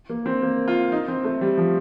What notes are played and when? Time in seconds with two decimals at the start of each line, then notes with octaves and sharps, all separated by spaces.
0.09 A#3
0.26 C4
0.42 A#3
0.68 F4
0.92 D#4
1.08 C4
1.24 A3
1.41 G3
1.57 F3